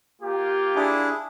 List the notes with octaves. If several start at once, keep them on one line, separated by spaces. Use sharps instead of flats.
A#3 F4 G4
D4 E4 G#4